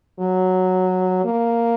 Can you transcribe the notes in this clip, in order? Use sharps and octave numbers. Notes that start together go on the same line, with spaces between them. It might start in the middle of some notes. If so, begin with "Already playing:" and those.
F#3
A#3